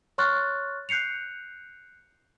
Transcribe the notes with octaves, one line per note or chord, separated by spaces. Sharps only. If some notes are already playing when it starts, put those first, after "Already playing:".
C#5 C6 C#6 F6 F#6 A6
F#6 G6 C7 C#7 F7